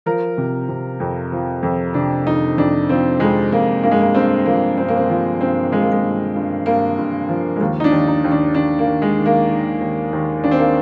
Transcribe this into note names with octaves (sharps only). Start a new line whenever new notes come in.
F3 A#4
C3
C3
F2
F3
F2
C3 D4
F2 D#4
F2 D4
F3 C4
F2 G#3
F2 A#3
G2 A#3
G#3
A#3
G2 C4
F3 A#3
G2 C4
A#3
C4
F3
G2 C4
F3 G#3
A#3
G#3
G2
G2
G2 A#3
G2
F3
G#3
D#2 A#3
D#4
D4
D#2
D#4
D#2
D4
D#2 D4
A#3
D#2
G#3
D#3
A#3
D#3
D#2
D#2
D#2 D4
C4
A#3